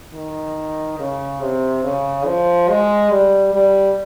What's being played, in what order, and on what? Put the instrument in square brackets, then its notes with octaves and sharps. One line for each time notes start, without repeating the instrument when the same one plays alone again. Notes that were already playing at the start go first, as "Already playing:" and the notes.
[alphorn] D#3
C#3
C3
C#3
F3
G#3
G3
G3